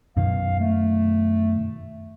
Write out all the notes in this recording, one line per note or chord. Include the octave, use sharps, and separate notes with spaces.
F#2 B2 D#3 F5
A3